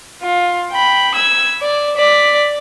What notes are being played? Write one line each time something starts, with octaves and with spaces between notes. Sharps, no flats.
F4
G5 B5
E6 G#6
D5
D5 B6